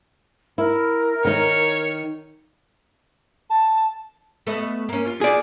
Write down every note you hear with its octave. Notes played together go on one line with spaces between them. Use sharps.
E4 A#4
D#3 D#4 C#5
A5
A3 B3 D#5
A#3 C#4
F4
G#4 D5